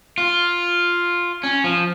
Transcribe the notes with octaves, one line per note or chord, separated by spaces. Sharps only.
F4
C#4
F3